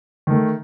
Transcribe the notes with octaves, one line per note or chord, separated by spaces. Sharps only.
D#3 A3